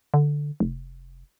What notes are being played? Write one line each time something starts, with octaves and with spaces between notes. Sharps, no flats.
D3
F1